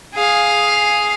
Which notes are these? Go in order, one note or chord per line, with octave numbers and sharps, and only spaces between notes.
G#4 F5